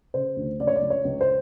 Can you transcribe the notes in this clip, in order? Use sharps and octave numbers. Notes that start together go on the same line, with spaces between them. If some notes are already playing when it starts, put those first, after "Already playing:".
C#3 C5
D2
C#2 D5
C#5
D5
C#2
C#5
C#2
C5